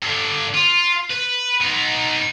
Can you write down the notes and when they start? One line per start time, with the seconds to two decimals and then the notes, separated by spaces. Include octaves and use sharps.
0.03 G2 D3
0.55 F4
1.11 B4
1.62 B3 D#4